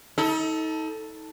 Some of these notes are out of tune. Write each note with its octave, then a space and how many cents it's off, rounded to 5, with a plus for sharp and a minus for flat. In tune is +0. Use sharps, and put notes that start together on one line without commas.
D#4 +35 A4 +0